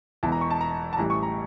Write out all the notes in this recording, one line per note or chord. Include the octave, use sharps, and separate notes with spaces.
E1 E2 E3 A5
A#5
C#6
A5
A#5
A5
A1 A2 E3 G3 A#5
C#6
A#5